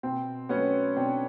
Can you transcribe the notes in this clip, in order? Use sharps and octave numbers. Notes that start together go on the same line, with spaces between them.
B2 C4
F#3 A3 B3 C#4
B2 C4 D4